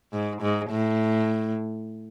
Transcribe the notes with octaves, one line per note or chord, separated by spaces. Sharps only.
G#2
G#2
A2